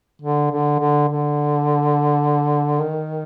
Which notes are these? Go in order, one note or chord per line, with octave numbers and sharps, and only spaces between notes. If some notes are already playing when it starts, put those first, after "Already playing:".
D3
D3
D3
D3
D#3